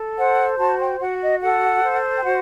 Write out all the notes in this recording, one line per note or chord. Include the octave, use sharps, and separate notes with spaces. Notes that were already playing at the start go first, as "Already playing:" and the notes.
Already playing: A4
C5 F#5
F#4 A5
G5
F#4 F#5
D#5
A4 F#5
C5
G5
F#4 F#5